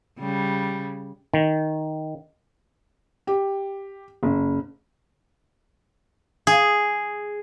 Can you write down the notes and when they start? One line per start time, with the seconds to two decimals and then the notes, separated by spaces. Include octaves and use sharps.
0.20 C#3 G3
1.34 D#3
3.27 G4
4.23 F#1
6.47 G#4